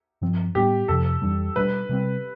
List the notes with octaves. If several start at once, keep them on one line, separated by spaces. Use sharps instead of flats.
G2 F3 C4
A2 G3 B3 D4 G4
F2 C3 F3 A4
F2 E3 G3 D4
B2 G3 B3 D4 B4
C3 G3 C4